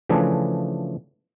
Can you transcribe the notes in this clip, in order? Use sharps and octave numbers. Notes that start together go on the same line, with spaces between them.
C#3 E3 F3 A3 D4 G#4